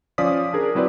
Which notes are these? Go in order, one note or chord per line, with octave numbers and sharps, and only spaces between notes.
F3 C#4 D5 F5 D#6 B6
D4 G#4 A#4
F#3 C4 E4 B4 D5